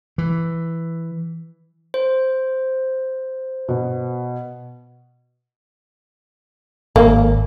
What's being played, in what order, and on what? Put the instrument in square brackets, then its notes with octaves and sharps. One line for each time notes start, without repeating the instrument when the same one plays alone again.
[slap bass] E3
[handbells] C5
[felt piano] B2
[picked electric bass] G#1 [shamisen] A#3